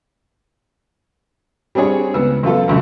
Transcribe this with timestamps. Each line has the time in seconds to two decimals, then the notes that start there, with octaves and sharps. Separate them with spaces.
1.75 G3 C4 D4 G#4 C#5
2.14 C#2 B3 E6
2.43 F#2 B3 F4 A4
2.68 C#2 F#2 C#3 F3